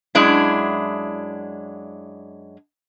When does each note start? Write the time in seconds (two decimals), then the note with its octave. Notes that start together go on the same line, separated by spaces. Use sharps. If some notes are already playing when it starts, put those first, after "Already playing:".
0.15 F#2 G#3 D4 E4